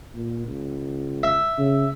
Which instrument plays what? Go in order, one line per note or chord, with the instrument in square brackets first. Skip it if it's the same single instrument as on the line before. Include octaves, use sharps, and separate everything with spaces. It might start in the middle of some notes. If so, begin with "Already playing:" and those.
[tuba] A#2
C#2
[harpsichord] E5
[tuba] C#3